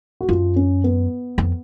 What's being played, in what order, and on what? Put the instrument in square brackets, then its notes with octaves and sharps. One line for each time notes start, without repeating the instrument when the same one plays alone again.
[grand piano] F#4
[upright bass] F#2 [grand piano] F4
[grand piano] C#4
B3
[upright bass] F2